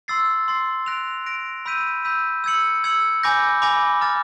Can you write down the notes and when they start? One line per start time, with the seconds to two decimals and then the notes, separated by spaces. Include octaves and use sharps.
0.08 C6 E6 A6 C7
0.48 C6 E6 A6 C7
0.86 F#6 A#6 D7 F7
1.26 F#6 A#6 D7 F7
1.66 B5 E6 G6 B6 D#7
2.05 B5 E6 G6 B6 D#7
2.44 E6 G#6 C#7 F#7
2.84 E6 G#6 C#7 F#7
3.23 G#5 B5 D6 G6 A#6
3.62 G#5 B5 D6 G6 A#6
4.01 A#5 D6 F6 A6